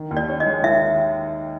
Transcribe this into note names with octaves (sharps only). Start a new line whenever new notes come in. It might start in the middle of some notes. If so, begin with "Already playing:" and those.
Already playing: D#3
D#2
D5
C#4
D#5
G#3
D#3 E5